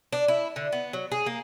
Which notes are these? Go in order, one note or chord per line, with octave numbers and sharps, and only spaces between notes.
D4
E4
D3
B3
F#3
G#4
A#3